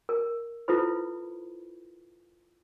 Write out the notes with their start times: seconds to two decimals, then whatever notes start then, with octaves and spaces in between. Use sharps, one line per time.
0.09 A#4
0.68 E4 F4 A4 B4 C5 B5